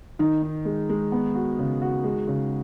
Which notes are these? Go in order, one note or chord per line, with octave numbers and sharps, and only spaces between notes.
D#3 D#4
D#4
G#3
G#3
B3
F#4
C#3
F#4
G#3
C#3